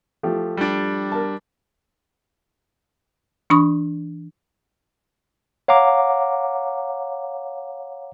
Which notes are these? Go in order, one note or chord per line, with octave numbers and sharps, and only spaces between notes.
F3 A3 G4
G3 D4
A#4 A5
E3 D4 B5 C#6 D#6
C#5 F5 F#5 A#5 D6